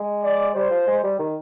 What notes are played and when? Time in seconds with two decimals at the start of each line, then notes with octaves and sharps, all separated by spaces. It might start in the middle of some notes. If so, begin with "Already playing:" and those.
Already playing: G#3
0.24 D5
0.55 G3 C5
0.71 F3
0.88 G#3
1.03 G3
1.19 D#3